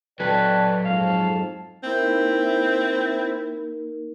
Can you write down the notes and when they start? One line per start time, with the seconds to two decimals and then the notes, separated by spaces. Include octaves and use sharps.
0.20 F#3 A4 B4 D5 G5 A5
0.85 F2 G#2 F5 A5
1.83 A#3 C4 D#4 E4 A#4